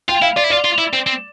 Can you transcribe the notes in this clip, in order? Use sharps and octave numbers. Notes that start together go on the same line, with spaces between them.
F4 G5
E4 F5
F4 D5
E4
F4 D5
F4
E4
C4
C4